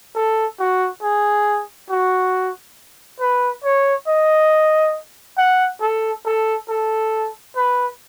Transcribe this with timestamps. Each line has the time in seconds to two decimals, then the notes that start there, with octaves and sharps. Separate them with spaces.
0.15 A4
0.59 F#4
1.02 G#4
1.90 F#4
3.20 B4
3.64 C#5
4.07 D#5
5.38 F#5
5.81 A4
6.26 A4
6.69 A4
7.56 B4